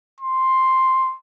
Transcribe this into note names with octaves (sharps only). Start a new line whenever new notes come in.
C6